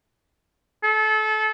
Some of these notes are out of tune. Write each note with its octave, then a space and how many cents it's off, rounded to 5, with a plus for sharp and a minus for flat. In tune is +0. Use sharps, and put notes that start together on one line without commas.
A4 -30